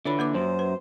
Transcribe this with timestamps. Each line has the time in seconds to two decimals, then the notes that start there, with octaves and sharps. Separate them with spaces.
0.05 D3 E3 F4 C#5 B5
0.19 A#3 B4 D6
0.34 F#2 C5
0.59 B4